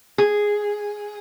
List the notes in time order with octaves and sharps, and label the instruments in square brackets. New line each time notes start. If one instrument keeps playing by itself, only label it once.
[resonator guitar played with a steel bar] G#4